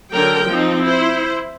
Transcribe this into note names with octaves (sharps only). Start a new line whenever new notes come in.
D3 F#3 A#4 G5
F3 C4 D#4
E4 C5